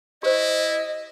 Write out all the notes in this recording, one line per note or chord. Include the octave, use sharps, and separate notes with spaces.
E4 G4 C5 D#5